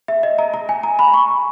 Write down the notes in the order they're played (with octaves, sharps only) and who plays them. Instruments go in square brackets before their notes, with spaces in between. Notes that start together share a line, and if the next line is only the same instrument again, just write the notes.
[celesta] E5
D#5
A#5
A#5
G#5
A#5
B5
C#6